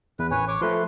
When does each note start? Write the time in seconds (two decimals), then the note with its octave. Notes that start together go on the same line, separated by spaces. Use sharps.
0.19 E2 B4
0.31 A1 B4 C#5 G#5
0.48 C#5 C#6 D6
0.61 F3 A3 B4 C6